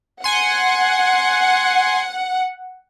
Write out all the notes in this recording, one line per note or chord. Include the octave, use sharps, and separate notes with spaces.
F#5 G#5 C6